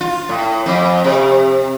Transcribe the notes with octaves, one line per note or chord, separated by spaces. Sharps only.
F4
A2
F2
C3